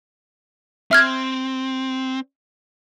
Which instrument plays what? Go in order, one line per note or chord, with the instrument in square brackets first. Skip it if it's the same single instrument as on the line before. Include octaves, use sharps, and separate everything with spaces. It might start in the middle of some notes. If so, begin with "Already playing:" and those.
[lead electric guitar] C4 [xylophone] E5 F6 G#6